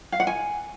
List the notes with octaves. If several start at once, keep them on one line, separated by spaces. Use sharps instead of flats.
F5
F#5
G#5